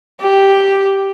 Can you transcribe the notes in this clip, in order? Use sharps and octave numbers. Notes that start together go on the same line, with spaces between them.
G4